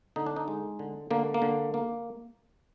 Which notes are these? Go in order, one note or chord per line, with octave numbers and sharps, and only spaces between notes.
D3 D#4
D4
D#4
G#3
D3
D3 A#3
A#3
D3
A#3